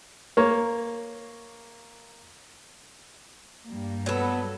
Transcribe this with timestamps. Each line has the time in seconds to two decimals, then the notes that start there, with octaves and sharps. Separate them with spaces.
0.37 A#3 C#5
3.69 G2 G3 A#3
4.06 F#3 B3 A4